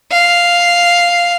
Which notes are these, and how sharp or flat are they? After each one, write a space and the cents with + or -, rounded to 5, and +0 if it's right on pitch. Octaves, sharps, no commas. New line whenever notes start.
F5 +0